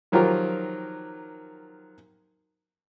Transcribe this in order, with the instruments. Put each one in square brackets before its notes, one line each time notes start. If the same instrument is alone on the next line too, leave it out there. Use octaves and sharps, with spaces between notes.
[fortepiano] D#3 F3 F#3 F4 G4 A#4